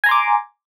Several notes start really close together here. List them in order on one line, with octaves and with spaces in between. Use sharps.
G#5 A#5 C6 D6